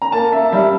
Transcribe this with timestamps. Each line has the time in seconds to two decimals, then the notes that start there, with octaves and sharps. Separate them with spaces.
0.02 A#5
0.12 A#3 A5
0.32 E5
0.52 G3 E5